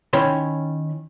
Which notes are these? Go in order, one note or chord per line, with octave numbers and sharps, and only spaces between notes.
D#3 C#4 E4 C#5 B5 C6